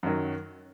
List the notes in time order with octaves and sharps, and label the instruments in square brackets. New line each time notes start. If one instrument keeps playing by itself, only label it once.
[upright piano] F#2 D#3 F#3